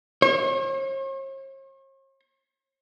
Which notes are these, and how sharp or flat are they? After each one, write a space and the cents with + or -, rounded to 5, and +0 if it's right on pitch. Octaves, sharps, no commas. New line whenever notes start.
C#5 -45